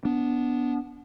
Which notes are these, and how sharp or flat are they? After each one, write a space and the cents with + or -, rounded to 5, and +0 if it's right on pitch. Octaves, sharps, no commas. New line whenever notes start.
B3 +0 D4 -15